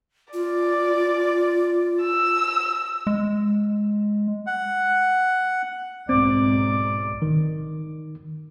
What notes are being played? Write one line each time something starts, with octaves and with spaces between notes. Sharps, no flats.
F4 D5
E6
G#3
F#5
B1 G#2 C4 D5
D#3